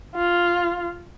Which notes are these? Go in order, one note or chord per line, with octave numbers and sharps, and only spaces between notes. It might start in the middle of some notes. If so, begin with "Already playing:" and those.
F4